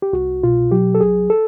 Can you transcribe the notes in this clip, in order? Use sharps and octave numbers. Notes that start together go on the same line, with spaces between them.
G4
C2 F#4
B2 F4
F#3 G4
A4
C2 G#4
A4